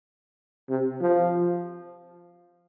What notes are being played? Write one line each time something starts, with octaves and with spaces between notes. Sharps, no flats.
C3
F3